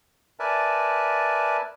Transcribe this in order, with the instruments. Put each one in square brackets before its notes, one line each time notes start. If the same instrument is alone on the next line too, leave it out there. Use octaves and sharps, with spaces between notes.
[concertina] A#4 B4 D5 E5 G#5 A5